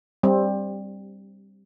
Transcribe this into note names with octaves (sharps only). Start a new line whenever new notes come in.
G3 C4